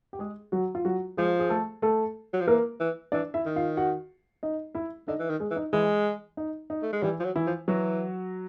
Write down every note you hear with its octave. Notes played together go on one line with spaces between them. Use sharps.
G4
G#3 G#4
F#3 F#4
F4
F#3 F#4
F3 G#3 G#4
G#4
A3 A4
A3 A4
F#3
F3
E3 A#3 A#4
E3
E3 D4 D5
E4 E5
D#3
F4 F5
F#4 F#5
D#4 D#5
E4 E5
D3 D#4 D#5
E3
D#3
G#3 G#4
E3
D#4
E3 G#3 E4
D#4
D#4
A3
G#3
E3 G3 E4
F3
F#3
E3 E4
F3
E3 F#3 F#4